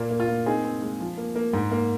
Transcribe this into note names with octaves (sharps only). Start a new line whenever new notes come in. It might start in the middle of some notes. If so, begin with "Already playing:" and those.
Already playing: A#2 A#3
A#3
F4
A#3
C4 D#4 G#4
C4
G#3
F3
A#3
A#3
G#2
A#3